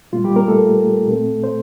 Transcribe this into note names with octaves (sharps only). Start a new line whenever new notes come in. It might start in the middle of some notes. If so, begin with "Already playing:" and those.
A#2 G3 A#3 F4
G3 G4
A#3 A#4
A3 A4
A#2 A3 C4
C5